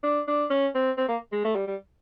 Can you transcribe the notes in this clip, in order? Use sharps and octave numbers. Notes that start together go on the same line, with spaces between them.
D4
D4
C#4
C4
C4
A#3
G#3
A3
G3
G3